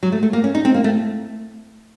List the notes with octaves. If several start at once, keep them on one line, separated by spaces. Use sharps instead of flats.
F#3
A3
A3
A#3
C#4
D#4
C4
A#3
A3